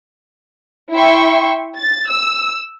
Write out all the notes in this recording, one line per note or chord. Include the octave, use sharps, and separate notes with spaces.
E4 E5 G5 C6 C#6
A6
E6